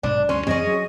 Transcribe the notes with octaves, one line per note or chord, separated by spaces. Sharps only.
B1 G#2 D4
D2 G2 C#4 C6
F#2 E3 C4 C#4 G#4 D#5
F#3